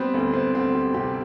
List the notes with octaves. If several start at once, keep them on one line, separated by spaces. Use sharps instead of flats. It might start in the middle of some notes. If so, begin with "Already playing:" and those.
Already playing: G3 B3 C4
D2 B3
C4
D2 C4
G4
C3 G4